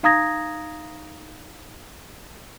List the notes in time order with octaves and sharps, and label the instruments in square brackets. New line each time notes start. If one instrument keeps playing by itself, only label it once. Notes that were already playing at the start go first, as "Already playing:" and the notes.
[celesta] D#4 F5 A#5 D#6 G#6 A#6